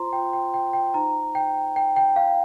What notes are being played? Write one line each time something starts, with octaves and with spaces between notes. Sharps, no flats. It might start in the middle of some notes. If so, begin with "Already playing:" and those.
Already playing: F4 C5 A#5 C6
G5
G5
G5
G5
D#4 C5 A#5
G5
G5
G5
F5